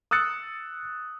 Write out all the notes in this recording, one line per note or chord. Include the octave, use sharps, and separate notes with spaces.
D#6 E6 F#6 A6 C#7